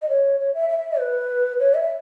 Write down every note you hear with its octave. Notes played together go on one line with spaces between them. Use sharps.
D#5
C#5
C#5
E5
E5
B4
C#5
E5